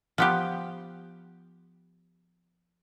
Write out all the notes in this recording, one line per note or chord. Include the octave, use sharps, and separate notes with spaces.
F3 B3 G4